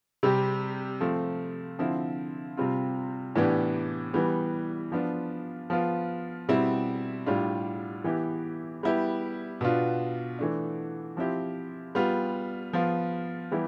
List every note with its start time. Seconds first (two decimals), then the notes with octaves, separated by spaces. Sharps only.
0.23 C3 G3 C4 G4
1.01 F3 A3 C4
1.79 D3 F3 C4 E4
2.57 C3 G3 C4 F4
3.36 A2 E3 B3 D4 G4
4.14 E3 G3 B3
4.92 F3 B3 D4 F4
5.70 F3 B3 F4
6.48 B2 G3 C4 E4
7.26 A2 G3 D4 F4
8.04 E3 B3 E4 G4
8.83 G3 B3 E4 G4
9.61 B2 B3 D4 F4
10.39 E3 A3 D4
11.17 F3 C4 E4 G4
11.95 G3 B3 F4
12.73 F3 B3 F4
13.51 E3 G3 B3 E4 G4